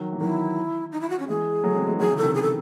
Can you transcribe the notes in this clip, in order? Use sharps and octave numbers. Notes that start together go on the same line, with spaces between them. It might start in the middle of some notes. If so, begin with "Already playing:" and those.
Already playing: D#3 F#3
E3
D#3 F#3 E4
D#4
E4
F#4
C#4
E3 G#3 G#4
F#3 A3
G#3 C4
E3 G#3
D#3 F#3 G#4
C#3 E3
A4
C3 D#3
G#4
A4